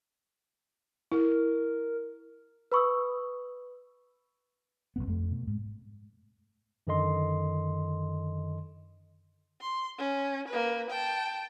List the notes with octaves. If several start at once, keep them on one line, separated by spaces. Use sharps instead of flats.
E4 A#4
B4 B5 C#6 D#6 E6
B1 F#2 B3
F2 A3
B2
G#2
F#2 D3 D#3 A4 D#5 C6
C6
C#4
A#3 B4
G5 A5